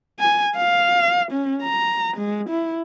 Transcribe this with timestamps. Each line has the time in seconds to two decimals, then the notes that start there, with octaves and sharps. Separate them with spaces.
0.20 G#5
0.57 F5
1.32 C#4
1.63 A#5
2.17 G#3
2.50 E4